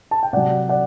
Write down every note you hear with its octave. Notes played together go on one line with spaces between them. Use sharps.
A5
G5
C3 F#3 D5 F#5
D5 F#5